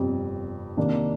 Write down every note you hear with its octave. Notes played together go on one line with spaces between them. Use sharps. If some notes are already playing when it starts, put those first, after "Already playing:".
Already playing: G1 F2 C3 G3 C4
C3 D#3 A#3 D4